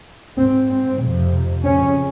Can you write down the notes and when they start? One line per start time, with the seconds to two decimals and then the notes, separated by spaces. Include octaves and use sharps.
0.37 G#2 C4
0.69 C4
1.00 F2 C3
1.64 F2 C#3 C#4